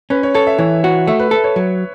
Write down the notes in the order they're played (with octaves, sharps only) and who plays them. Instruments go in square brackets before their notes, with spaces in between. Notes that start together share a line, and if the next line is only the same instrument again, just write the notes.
[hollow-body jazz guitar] C#4 [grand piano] B4
[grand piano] C#5
[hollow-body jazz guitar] A4 [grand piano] C#5
[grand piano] E5
[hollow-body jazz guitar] E3 [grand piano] C#5
[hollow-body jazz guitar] F#4
[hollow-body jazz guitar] A3 [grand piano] E5
[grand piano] B4
[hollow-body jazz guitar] A4 [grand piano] B4
[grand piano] C#5
[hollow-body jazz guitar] F#3